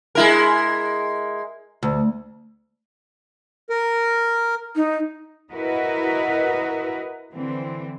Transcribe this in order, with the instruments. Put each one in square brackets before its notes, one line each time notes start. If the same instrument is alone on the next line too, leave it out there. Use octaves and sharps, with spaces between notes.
[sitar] G#3 E4 A#4
[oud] D2
[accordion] A#4
[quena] D#4
[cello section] E4 F#4 A#4 B4 D#5
D3 E3 C4